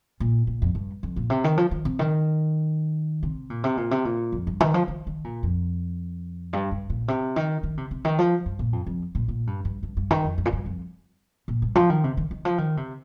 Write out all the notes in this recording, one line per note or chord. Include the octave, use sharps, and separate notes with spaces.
A#2
A#2
F2
G2
F2
A#2
C3
D#3
F3
D#3
C3
D#3
C3
A#2
C3
A#2
C3
A#2
F2
G2
D#3
F3
D#3
D#3
A#2
F2
G2
G2
A#2
C3
D#3
D#3
C3
C3
D#3
F3
G2
A#2
F2
F2
A#2
A#2
G2
G2
G2
G2
D#3
F2
G2
A#2
G2
F2
A#2
G2
F3
D#3
C3
D#3
D#3
F3
D#3
C3